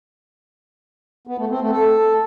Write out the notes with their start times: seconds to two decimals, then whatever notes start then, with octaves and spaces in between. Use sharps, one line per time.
1.27 B3
1.38 A3
1.49 C4
1.60 A3
1.71 A4